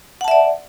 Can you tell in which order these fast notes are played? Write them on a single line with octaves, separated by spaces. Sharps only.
F#5 A5 E5 D5